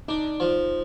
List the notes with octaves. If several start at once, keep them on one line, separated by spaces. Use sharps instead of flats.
D4 D#4
F3